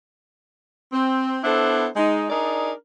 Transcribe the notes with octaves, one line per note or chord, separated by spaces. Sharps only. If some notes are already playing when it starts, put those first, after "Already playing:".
C4
B3 D4 E4 A4 C5
G#3 D#4
D4 D#4 G#4 A#4 D5